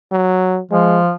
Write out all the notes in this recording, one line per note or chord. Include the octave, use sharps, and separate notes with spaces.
F#3
F3 G#3